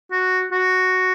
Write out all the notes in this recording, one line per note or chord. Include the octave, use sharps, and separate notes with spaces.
F#4
F#4